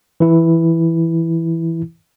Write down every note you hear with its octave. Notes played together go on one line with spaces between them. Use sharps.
E3 E4